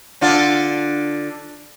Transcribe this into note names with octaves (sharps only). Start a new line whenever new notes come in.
D3 D4 F4